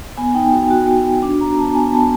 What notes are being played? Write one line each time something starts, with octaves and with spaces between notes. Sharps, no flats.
B3 G#5
D#4 G5
F#4 G5
F#4
F#4
F#4
D4
B3 A#5
B3 A5
B3 G#5
B3 A5